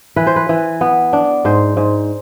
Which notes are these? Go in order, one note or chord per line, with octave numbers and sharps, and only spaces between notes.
E3 B4
C5
B4
E3
B3
D4
G#2 C5
G#2